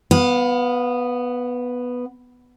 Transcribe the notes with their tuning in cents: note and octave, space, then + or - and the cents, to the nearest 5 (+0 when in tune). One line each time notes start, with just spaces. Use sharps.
B3 +0 F5 +35